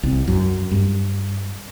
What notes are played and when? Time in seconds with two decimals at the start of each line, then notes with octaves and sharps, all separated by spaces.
0.03 C2
0.28 F#2
0.71 G2